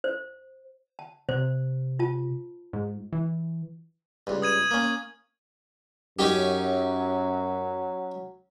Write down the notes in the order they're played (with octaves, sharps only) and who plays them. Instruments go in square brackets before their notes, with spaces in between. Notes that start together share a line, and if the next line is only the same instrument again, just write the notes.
[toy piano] C5
A5
[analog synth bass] C3 [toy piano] C5
[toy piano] F4 A5
[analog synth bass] G#2
E3
[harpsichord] C#2 G2
[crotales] D#6 G#6 D#7
[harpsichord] A#3 C#4
[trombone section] F#2 [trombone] F#3 [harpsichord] C#4 D#4 G4